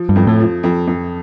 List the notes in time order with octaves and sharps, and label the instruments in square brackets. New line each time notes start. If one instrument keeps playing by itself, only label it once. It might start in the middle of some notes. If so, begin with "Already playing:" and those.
Already playing: [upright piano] F3
[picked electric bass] G2
[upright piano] F2
[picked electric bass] A2
[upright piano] F3
F2
F2